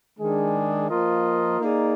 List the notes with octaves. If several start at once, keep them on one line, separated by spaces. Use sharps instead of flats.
D#3 G#3 D4 G#4
F3 A#3 F4 A#4 D#5
A#3 D#4 G#4 D5